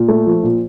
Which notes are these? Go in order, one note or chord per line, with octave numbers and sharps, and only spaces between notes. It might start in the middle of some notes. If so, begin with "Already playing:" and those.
Already playing: A#2
A3
F3
A#2